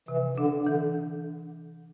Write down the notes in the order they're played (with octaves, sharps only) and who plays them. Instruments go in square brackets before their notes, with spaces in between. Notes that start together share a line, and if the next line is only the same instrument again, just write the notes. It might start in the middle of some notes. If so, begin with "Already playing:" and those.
[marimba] C3 [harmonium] E3
[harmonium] D3 [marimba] D4
[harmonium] D3 [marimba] E3